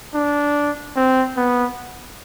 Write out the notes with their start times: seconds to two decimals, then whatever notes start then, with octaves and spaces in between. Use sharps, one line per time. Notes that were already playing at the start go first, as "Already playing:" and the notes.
0.14 D4
0.96 C4
1.37 B3